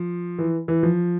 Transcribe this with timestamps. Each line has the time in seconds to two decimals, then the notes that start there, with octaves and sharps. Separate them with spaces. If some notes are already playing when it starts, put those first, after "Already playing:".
Already playing: F3
0.39 E3
0.68 E3
0.83 F3